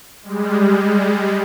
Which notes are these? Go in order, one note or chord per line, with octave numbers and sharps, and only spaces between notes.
G3 G#3